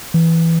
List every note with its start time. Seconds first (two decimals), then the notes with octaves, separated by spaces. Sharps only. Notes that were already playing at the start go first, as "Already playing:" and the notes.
0.14 E3